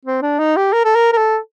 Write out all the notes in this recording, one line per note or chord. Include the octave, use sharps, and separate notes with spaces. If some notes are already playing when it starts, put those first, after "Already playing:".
C4
D4
D#4
G4
A#4
A4
A#4
A#4
A4